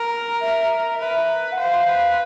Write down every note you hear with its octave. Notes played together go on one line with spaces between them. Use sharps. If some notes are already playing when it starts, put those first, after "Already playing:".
Already playing: A#4
E5
B4 E5
F#5
C5 F5
B4